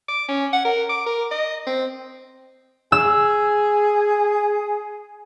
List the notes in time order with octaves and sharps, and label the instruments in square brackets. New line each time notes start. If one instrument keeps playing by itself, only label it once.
[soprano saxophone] D6
C#4
F#5
A#4
D6
A#4
D#5
C4
[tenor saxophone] G#4 [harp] E6